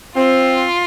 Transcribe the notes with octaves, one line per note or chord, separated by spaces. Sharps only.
C4 F4